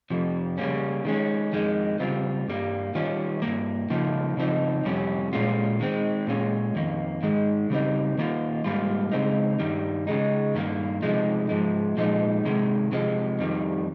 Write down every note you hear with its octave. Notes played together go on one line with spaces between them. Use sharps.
F2 C3 F3
C#3 G3 A#3 C#4
D#3 G#3 C#4
F2 D#3 G#3
C#3 G3 C4 F4
G2 G3 A#3
D#3 G3 C#4 F4
G2 F3 A#3
C#3 F3 A#3 D#4
C#3 F3 C4 D#4
F2 C3 G3 C#4
A#2 G#3 C#4 F4
D#3 G#3 C4
A#2 G#3 C#4 F4
F2 D#3 A#3
G#2 D#3 G#3
C#3 G3 C4 D#4
D#3 A#3 F4
G#2 G3 A#3 F4
C#3 G#3 C4 D#4
G2 D#3 G3
C#3 G#3 D#4
G2 D#3 A#3
C3 F3 G#3 D#4
G#2 F3 G#3
A#2 F3 G#3 D#4
C3 D#3 G#3
C3 F3 G#3
F2 D#3 G3